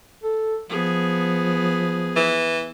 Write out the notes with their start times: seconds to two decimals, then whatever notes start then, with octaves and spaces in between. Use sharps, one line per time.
0.23 A4
0.69 F3 B3 G#4
2.16 E3